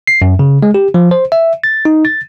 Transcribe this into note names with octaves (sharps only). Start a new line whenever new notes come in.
C7
F#2
C#3
G#3
G4
F3
C5
E5
A6
D#4
A6